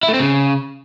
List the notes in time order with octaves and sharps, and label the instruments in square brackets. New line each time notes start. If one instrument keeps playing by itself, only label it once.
[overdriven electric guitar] E4
A3
C4
C#3